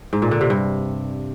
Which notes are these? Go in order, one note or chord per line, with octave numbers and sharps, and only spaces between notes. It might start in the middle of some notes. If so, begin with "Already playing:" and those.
G#2
A#2
D3
C3
G2